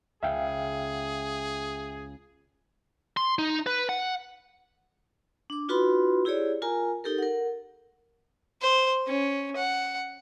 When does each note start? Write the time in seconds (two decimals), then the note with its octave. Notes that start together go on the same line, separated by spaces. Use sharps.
0.23 C#2 G#4 E5 F5 G5
3.17 C6
3.39 D#4
3.66 B4
3.89 F#5
5.50 D4 D6
5.69 D#4 F4 F#4 B4 B5 C6
6.25 E4 G4 G#4 C#5 D5
6.62 F4 A#4 G#5 A#5
7.04 D#4 G4 A4 A#4
7.18 A#4 F#5
8.62 C5
9.07 C#4
9.56 F#5